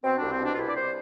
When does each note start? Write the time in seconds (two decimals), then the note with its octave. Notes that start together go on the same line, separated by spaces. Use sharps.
0.03 B2 C4
0.16 D4
0.22 C2
0.30 C4
0.39 B2 D4
0.54 F4
0.57 C2 E4
0.68 D5
0.75 C2 C5